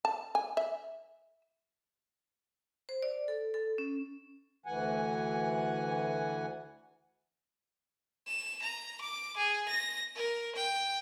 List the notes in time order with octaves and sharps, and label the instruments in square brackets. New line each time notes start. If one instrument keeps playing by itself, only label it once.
[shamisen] A5
G#5
E5
[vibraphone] C5
D5
A4
A4
C#4
[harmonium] D2 E3 F#5 G#5
[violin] E7
A#5
D6
G#4
A#6
A#4
G5